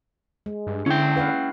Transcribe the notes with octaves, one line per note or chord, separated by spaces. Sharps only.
G#3
G2
D3 C#4 E4 G5
B4 F5 F#5